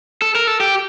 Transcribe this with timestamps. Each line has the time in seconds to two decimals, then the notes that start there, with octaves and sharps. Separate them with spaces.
0.22 A4
0.35 A#4
0.47 A4
0.60 G4